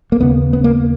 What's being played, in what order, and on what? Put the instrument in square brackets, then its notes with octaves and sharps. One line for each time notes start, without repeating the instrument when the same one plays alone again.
[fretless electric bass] A#3
D#2 C#3 B3
B3
A#3